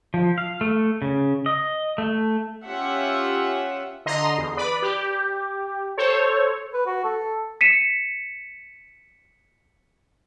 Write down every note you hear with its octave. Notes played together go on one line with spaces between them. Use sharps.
F3
F5
A3
C#3
D#5
A3
C#4 F4 G4 E5 F#5
D3 D#5 A#5 C6
E2
B4 D5 B5
G4
A4 C5 C#5
B4
F#4
A4
B6 C#7 D#7 E7